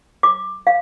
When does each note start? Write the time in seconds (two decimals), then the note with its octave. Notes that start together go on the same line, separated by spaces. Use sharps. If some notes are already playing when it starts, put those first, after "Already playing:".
0.23 D6
0.67 F5